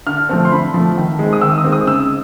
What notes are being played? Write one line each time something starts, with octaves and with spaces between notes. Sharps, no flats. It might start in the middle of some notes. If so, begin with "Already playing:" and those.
D3 F6
F3 A3 C4
C6
D3 B5
F3 A3 C4
D#3
G#3 C4
D#6
D#3 E6
D#6
G#3 C4
D#6
C#3 E6